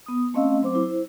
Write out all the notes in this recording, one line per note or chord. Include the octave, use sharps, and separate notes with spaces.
B3 D#6
A3 C4 C#4 D#5 F5 E6
F#3 C4 C5 D6
E4 C5